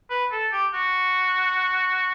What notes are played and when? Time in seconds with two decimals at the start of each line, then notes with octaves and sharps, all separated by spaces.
0.11 B4
0.32 A4
0.52 G4
0.74 F#4